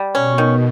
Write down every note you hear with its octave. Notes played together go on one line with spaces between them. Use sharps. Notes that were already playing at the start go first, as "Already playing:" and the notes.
Already playing: G3
B2 C#4
D#3